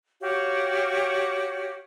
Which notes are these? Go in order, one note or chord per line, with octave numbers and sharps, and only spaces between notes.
F#4 G4 C#5 F5